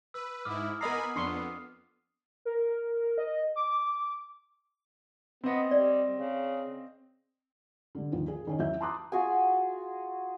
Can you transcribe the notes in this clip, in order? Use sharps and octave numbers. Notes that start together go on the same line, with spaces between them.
B4 E6
G#2 E4 D6 D#6 F6
B3 A#4 D#5 G#5 A#5 B5 D#6 C7
F2 B3 D4 C6 C#6 C7
A#4
D#5
D6
B3 C4 D#5
G3 D5
C#3
D3 G3
D#2 F3
G#4
D#3 C#4 D#4
E2 F#3 E5 G6
A5 A#5 C6 D6 D#6 F#6
F4 F#4 G#4 G#5